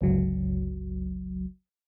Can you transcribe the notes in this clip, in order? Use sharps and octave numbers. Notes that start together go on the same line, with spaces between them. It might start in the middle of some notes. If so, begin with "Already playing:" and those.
G1 C#2 F#3